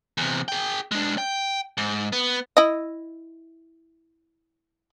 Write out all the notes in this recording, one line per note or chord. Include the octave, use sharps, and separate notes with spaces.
E2 C3
G#4 G5
G#3 D4
G5
G#2
B3
E4 D#5